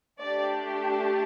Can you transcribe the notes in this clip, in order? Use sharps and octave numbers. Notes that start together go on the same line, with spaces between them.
A3 D4 G4 D5